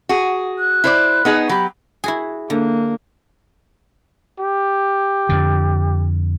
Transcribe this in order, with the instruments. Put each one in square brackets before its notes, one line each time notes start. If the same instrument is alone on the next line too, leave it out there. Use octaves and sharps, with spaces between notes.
[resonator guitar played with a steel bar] F#4 G#4
[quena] F#6
[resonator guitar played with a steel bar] E4 C5 D5
B3 D#4 G#4
[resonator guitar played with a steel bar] F#3 G4 [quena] B5
[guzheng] E4 F#4 G#4
[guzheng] D3 [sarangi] A#3
[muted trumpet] G4
[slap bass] F2 D3